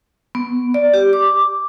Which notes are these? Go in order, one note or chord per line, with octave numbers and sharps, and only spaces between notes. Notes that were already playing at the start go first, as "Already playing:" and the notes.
B3
D5
G4
D6